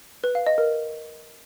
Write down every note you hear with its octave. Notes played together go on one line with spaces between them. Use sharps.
B4
F5
D#5
A#4